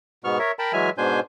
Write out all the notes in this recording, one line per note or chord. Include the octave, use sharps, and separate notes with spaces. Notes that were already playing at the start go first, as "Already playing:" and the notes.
G#2 B2 B3 C#6 F6
A#4 C#5 E5
A#4 G5 A5 B5
E3 F#3 G#3 E5 G#5 F6
G#2 B2 D4 C5 G#5 G6